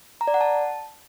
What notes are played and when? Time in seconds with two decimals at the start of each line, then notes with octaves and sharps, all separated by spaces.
0.21 A#5
0.27 D5
0.34 F#5
0.41 A5